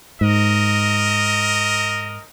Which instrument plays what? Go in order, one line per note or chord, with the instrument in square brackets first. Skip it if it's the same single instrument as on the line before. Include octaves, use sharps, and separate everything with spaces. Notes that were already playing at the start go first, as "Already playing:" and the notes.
[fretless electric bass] G#2 [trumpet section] A#4 D#5